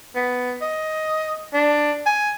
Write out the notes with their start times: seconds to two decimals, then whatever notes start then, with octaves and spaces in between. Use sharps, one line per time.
0.15 B3
0.61 D#5
1.54 D4
2.06 G#5